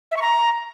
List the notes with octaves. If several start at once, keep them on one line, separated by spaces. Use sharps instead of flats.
E5
C#6
A#5